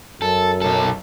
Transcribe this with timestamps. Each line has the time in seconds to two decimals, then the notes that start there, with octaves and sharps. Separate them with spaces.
0.22 F#2 A4
0.62 B1 A4